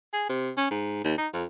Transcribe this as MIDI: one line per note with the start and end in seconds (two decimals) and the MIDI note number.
0.13 0.29 68
0.29 0.51 48
0.57 0.68 61
0.70 1.02 44
1.04 1.15 39
1.18 1.28 63
1.33 1.45 41